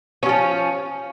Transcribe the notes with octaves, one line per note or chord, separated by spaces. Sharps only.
F3 F#3 C#4